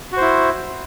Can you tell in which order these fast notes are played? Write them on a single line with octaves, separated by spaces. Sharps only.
F#4 C5 E4